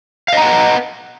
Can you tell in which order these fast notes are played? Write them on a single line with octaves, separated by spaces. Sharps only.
F5 D#5 A#5 F#5 B4